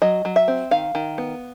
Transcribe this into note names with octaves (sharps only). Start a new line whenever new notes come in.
F#3 D#5
F#3
E5
C4
D#3 F5
D#3
B3